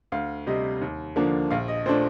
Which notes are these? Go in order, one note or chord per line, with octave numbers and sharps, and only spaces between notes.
D2 F5
C3 G3 D#5
D#2
D3 F3 A#3 D4
A#1 F5
D#5
A#2 A3 D4 C5